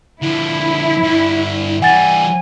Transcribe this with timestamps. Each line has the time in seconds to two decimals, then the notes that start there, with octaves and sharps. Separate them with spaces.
0.22 D3 F3 E4
1.04 G2 D3
1.82 E3 G3 F#5 G#5 A6